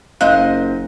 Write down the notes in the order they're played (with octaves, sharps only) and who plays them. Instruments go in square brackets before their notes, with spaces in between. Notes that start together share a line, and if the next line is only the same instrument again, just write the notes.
[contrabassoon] F#1 [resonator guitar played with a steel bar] A#2 C5 D#5 [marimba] F5 F#6